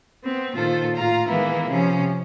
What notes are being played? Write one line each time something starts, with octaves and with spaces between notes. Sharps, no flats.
B3 C4
A#2 D#3 F4 A4 C5
A2 F4 F5 A#5
D#3 E3 G#3 A#3 B3 E4
C3 F3 C#4